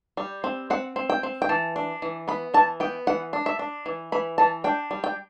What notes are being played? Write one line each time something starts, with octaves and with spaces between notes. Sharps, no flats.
G3
C4
C4 F#5
C4
G5
C4
G5
E3 A5
D4
E3
B3 B5
E3 A5
B3 G5
E3 F#5
D4
E5
D4
E3
E3 B5
E3 A5
D4 G5
G3
G5